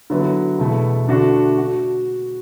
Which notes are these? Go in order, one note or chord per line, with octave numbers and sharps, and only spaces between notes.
D3 F#3 B3 E4
E2 B2 A3 E4
D3 A3 D4 F#4
F#4